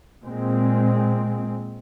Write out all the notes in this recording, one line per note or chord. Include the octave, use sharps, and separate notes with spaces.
A#2 G#3 C4